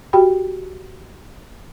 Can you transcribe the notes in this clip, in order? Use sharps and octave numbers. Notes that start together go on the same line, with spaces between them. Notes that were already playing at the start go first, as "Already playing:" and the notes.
F#4 G4 G5 B5